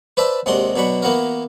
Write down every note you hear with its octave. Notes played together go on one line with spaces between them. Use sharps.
B4 C5 D5 E5 A5
D#2 C3 G#3 D4 F#4 C6
B2 F#3 D4 B5 C#6
E3 A#3 B3 F#4 A#4